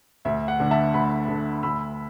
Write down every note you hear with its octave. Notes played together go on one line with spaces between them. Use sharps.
D2 E5
F#5
D3 A3
E5 A5
D2 F#5 B5
D3 A3
D2 B5 E6